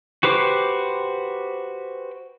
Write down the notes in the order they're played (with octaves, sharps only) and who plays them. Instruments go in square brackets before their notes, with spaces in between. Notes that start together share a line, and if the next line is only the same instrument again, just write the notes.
[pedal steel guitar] F#4 G4 B4 C5 D6